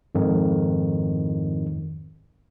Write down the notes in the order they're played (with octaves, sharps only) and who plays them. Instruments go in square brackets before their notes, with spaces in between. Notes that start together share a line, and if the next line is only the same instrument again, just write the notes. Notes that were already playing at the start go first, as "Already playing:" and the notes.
[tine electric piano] F2 G#2 D#3